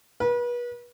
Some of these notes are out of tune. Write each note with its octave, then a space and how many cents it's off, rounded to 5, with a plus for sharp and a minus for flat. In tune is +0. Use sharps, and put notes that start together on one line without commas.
B4 -35